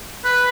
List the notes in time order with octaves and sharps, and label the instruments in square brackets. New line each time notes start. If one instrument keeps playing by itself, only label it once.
[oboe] B4